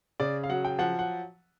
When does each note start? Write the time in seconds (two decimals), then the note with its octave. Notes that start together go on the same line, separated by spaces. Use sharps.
0.20 C#3 D5
0.43 F5
0.49 F#3 F#5
0.65 G5
0.79 F3 F#5
0.99 F#5